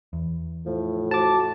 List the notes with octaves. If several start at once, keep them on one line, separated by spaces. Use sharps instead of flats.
E2
A2 F3
F#4 A5 D6